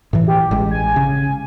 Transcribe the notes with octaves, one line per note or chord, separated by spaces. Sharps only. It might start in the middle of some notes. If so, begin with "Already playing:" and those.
A2 E3
G4
A1 G#3
G#5
C#3